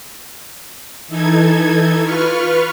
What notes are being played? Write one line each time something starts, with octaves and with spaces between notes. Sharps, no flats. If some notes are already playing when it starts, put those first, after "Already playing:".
E3 D#4 A4 G#6
F4 B4 C#6 F6